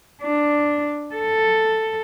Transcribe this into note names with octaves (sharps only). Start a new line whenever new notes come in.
D4
A4